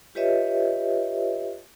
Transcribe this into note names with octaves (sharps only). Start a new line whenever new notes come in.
F4 G4 B4 C#5 D#5 E5